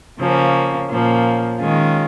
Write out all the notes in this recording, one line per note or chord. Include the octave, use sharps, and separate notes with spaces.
C#3 F3 A#3 C#4
A#2 F3 A#3 C#4
D#3 G#3 C#4 F4